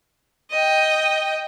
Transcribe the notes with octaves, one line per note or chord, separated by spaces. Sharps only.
D#5 G5